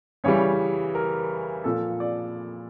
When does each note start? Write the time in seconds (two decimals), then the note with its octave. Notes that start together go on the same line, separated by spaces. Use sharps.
0.24 C#3 E3 G3 C#5
0.95 A#4
1.64 A#2 F3 A4
2.00 D5